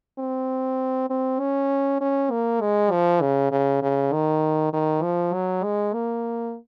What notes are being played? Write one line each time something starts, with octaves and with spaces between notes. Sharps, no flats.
C4
C4
C#4
C#4
A#3
G#3
F3
C#3
C#3
C#3
D#3
D#3
F3
F#3
G#3
A#3